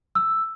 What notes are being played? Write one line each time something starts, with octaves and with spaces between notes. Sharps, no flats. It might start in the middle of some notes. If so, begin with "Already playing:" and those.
E6